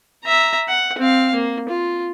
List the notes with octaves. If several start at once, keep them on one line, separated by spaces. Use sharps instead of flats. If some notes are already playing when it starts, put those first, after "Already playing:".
E5 A#5
F#5
C4 F5
A#3
F4